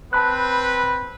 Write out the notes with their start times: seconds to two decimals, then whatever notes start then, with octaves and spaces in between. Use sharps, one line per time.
0.13 C4 B4 A5 B5 F#6